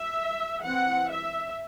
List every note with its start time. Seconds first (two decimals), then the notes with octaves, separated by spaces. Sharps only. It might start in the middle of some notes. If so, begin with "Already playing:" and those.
Already playing: E5
0.63 E3 C4 F#5
1.10 E5